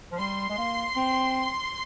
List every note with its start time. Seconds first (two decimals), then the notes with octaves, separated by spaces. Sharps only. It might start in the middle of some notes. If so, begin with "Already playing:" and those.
0.12 F3
0.19 G3 C6
0.50 G#3
0.58 A#3
0.96 C4